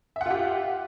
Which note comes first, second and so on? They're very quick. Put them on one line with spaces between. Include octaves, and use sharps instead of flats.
E5 F#5 F4 G4